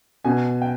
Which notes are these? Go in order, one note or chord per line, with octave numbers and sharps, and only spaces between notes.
B2 G#5
G5